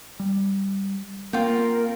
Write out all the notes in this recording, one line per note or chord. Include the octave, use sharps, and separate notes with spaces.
G3
A#3 C4 F4 A#4 G5